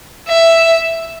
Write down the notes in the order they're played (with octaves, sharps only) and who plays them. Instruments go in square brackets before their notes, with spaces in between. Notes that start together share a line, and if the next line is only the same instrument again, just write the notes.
[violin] E5